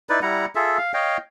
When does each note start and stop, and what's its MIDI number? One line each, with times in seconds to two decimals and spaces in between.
0.09 0.20 63
0.09 0.20 64
0.09 0.20 71
0.09 0.20 74
0.22 0.46 55
0.22 0.46 64
0.22 0.46 78
0.22 0.46 82
0.55 0.78 65
0.55 0.78 68
0.55 0.78 69
0.55 0.78 76
0.78 0.94 77
0.94 1.17 73
0.94 1.17 75
0.94 1.17 77
0.94 1.17 79